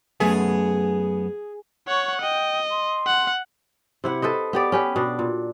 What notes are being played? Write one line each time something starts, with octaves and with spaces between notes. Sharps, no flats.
F#2 A3 B3 G#4
C#5 F#5 C#6
D#5 G5
C6
F#5
C3 E4 F#5
A4 B4 C5 D#5
B3 G4 D5
C#4 G4 B4
B2 D4
A#2